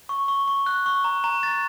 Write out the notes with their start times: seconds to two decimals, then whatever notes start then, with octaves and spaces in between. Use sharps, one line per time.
0.09 C#6
0.28 C#6
0.48 C#6
0.66 F#6
0.86 C#6
1.04 A#5
1.24 A#5
1.43 A6